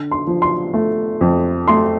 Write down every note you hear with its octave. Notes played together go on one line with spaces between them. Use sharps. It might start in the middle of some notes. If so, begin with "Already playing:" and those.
Already playing: D3
C6
F3
C6
A3
F2
A3 C6